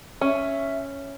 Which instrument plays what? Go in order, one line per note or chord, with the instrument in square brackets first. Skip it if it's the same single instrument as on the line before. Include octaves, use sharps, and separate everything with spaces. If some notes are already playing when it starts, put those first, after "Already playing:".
[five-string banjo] C#4 [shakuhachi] E5